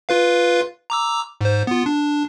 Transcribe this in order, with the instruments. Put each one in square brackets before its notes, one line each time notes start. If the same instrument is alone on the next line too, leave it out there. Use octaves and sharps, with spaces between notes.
[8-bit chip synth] F4 B4 F5
A#5 D6 E6
G#2 C5
B3 F4
D4